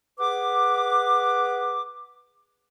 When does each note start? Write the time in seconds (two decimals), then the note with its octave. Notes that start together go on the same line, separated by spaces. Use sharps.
0.19 G#4 B4 F#5 D6